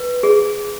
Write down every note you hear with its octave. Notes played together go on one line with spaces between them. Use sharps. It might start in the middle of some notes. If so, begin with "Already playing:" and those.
Already playing: B4
G#4